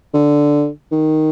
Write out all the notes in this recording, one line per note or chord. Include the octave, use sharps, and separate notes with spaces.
D3
D#3